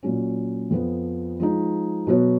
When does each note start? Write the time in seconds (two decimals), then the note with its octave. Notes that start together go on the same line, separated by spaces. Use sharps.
0.03 A#2 F#3 C#4
0.70 F2 F3 B3
1.40 F3 G#3 D#4
2.07 B2 F#3 B3 F#4 C#5